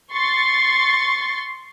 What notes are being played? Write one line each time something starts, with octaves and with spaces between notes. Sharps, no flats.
C6 C#6 A6